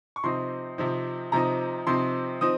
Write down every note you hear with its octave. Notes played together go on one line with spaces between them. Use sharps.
C#6
C3 F3 C4 D#4 C6
C3 F3 C4 D#4
C3 F3 C4 D#4 A#5
C3 F3 C4 D#4 C6
F3 C4 D#4 D#6